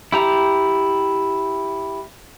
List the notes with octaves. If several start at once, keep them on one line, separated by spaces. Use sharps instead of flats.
E4 G4 A#5